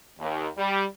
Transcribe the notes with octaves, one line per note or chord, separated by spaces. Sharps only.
D#2
G3